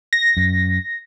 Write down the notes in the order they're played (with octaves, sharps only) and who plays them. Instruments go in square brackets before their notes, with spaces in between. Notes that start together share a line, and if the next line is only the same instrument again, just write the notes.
[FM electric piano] A#6
[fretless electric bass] F#2